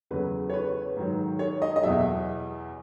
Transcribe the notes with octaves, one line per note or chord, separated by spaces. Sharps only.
E2 C#3 F#3 B4
C#5
B4
G#2 D#3 F#3
C#5
D#5
D#5
E2 B2 F#3 E5